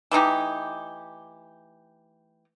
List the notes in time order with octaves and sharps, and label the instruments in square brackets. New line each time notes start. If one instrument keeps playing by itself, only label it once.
[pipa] E3 A3 D#4 G4